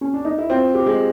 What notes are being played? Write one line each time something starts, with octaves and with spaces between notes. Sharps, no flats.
C#4
D4
D#4
E4
C4 F4
G4
G#3